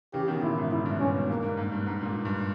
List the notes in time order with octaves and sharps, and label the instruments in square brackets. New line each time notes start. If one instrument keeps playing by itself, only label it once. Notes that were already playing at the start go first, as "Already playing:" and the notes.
[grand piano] C#3 E3 [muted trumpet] G4
[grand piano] B2 D#3
[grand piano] A#2 C#3 [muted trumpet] E4
[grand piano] G#2
[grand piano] G#2 [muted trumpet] E4
[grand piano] G2
[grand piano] G2 A#2 [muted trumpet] C#4
[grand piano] G#2 B2
[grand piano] G#2 [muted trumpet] A#3
[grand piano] G2
G#2
G2
G#2
A#2
G#2
G2